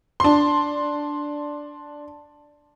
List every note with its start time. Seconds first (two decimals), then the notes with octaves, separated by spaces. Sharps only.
0.20 D4 C6